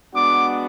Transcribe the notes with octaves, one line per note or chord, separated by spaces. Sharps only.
G#3 B3 D4 F#4 D6